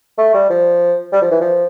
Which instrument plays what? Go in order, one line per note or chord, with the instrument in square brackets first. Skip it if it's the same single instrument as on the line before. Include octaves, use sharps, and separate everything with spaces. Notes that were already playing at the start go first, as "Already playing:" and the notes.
[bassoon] A3
G3
F3
G3
F3
E3
F3